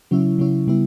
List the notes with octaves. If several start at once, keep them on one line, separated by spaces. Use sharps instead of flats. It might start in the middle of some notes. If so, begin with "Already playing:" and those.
C#3 F#3 C#4 E4
C#3 F#3 C#4 E4
C#3 G3 B3 E4